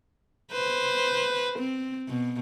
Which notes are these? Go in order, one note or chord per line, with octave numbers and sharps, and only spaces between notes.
B4 C5
C4
B2